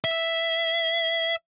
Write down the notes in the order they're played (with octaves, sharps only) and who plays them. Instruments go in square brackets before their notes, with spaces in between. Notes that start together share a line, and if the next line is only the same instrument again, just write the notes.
[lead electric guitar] E5